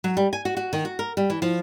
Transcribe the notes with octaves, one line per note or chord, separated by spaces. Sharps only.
F#3
G3
G#5
F#4
F#4
D#3
F#4
A#4
G3
E3
F3